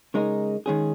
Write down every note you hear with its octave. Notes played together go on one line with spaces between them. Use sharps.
C#3 G#3 D#4 A#4
D#3 G#3 C#4 G#4